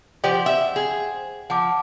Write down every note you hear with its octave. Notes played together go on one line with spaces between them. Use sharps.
F3 G4 C5 D5 F#5 G5
E5
G#4
F3 F#5 A5 D6